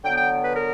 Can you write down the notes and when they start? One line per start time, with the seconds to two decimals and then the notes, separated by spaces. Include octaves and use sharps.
0.04 D3 F#3 B3 G5
0.17 G5
0.42 B4
0.54 A#4